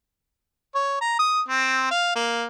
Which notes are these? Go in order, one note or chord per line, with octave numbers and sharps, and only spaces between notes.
C#5
A#5
D#6
C4
F5
A#3